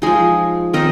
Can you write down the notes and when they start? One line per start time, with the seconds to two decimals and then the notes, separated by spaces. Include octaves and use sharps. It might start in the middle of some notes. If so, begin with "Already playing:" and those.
0.02 F3 G#3 D#4 G#4
0.73 D#3 C4 D#4 A#4 D#5